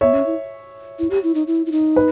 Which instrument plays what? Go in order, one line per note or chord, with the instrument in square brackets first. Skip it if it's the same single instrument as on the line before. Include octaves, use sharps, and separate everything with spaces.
[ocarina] B3 [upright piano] C#5 E5
[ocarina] C#4
E4
E4
G4
E4
D#4
E4
E4
D#4
[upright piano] B4